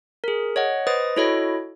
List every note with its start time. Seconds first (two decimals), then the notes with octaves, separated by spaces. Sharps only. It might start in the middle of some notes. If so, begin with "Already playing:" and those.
0.24 G#4 A#4
0.56 C#5 D#5 F#5
0.87 B4 C5 D#5 D#6 A6
1.17 E4 F#4 A4 C#5 D#5 B5